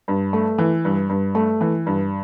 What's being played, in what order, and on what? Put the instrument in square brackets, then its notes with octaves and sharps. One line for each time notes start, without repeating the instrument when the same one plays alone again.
[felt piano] G2
A3
E3
G2
G2
A3
E3
G2